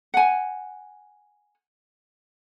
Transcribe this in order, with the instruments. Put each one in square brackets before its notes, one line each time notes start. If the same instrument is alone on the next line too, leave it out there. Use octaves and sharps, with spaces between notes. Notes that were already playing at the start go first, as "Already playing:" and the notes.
[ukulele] F#5 G#5